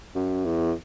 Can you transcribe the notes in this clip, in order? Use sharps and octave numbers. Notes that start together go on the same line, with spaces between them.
F#2
E2